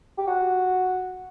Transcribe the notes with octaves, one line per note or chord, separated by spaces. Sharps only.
G4
F#4